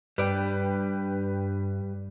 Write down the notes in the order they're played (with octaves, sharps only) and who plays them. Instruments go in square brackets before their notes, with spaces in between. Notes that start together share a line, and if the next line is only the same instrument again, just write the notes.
[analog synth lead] G2 [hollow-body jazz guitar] G3 D5 [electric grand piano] B4 G5